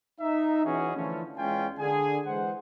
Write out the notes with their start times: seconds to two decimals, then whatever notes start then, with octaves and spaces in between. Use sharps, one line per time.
0.19 D#4 E5
0.64 B2 E3 C#4 F#4 G#4
0.96 D3 E3 F3 A3 C#4
1.37 E2 G#3 C#4 F4 G5 G#5
1.77 D3 G#4 G#5
2.26 E3 G#3 C5 F#5